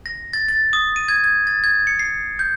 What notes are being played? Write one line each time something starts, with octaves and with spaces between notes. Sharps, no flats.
A#6
A6
A6
D#6
D#7
G#6
G#6
A6
G#6
C#7
C7
G6